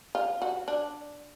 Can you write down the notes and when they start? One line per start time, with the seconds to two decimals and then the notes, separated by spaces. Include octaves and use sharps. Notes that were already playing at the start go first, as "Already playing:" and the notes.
0.15 F4
0.42 F#4
0.68 D4